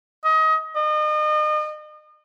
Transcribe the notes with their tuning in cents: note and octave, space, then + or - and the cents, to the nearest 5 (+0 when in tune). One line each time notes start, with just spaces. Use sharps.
D#5 +25
D#5 -35